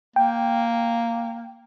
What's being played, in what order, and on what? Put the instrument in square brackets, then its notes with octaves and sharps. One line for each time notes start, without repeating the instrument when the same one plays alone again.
[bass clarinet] A#3 [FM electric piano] G5